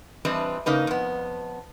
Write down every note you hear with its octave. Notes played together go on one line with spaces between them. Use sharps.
E3 G3 C4 D4 B4 D#5
C#3 A#3 D#4 B4
F2 B3